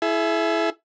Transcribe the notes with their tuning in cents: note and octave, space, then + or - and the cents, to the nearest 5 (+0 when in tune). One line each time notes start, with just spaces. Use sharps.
E4 +10 G#4 +40